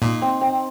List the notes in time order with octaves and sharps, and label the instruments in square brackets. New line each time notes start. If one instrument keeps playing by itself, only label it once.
[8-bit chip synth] A#2 [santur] D#4
[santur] C4
C4